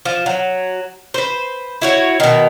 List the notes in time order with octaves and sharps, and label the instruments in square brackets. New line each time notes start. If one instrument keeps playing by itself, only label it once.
[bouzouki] F3
F#3
B4 C5
E4 F#4 C#5
B2 D#3